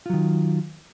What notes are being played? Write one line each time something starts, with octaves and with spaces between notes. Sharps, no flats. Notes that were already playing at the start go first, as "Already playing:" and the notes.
D#3 F#3 F4